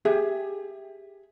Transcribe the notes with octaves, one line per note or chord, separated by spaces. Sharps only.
G4 G#4 E5